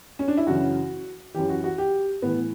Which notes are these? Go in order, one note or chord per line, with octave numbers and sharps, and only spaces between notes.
C#4
D4
E4
F#2 C#3 E3 F#4
F#2 E3 G4
F#4
F#4
G4
A2 E3 B3